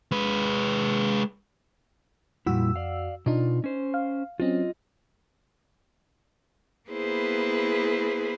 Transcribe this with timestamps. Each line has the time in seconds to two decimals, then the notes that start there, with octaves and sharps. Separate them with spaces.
0.12 G#3 B4
2.46 F2 A#2 G3 E4 F#4 E6
2.76 D5 F5
3.26 B2 D4 D#4 F4
3.64 C#4 C5
3.94 F5
4.40 F#3 C4 C#4 F4 D#5
6.89 A#3 B3 E4 G#4 B4 C5